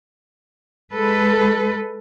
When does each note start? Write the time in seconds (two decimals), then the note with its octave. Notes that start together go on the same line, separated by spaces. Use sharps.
0.93 G#3 A4 B4